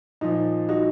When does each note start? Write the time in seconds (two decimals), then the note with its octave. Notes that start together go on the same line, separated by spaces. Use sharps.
0.21 A#2 F3 D#4
0.69 D#4 F#4